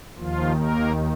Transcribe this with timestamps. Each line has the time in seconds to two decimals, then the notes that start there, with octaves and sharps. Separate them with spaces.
0.16 D#2 D#3 F3 F4
0.56 A#3 A#4